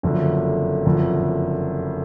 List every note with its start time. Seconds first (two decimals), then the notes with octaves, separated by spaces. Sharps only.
0.03 F#1 F2 D3
0.85 F#1 F2 D3